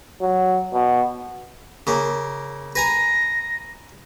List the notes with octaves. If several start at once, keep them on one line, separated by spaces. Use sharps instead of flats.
F#3
B2
C#3 A#3
B4 G#5 A#5 A#6